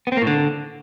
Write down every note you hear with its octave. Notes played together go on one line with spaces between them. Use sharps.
B3
C4
A#3
A2
D3